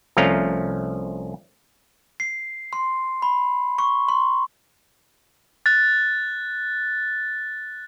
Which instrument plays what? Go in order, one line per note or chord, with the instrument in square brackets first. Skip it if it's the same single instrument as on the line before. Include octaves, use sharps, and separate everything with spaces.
[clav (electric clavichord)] C2 F3 A3 C#4 F5 A#5
[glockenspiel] C7
C6
B5
C#6
C6
[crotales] F#6 A6